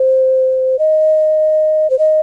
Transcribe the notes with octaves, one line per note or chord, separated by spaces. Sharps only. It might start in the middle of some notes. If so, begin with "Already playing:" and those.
Already playing: C5
D#5
C5
D#5